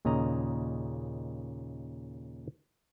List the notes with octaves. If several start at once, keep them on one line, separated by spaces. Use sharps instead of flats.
D#2 A#2 C#3 D#5 A#5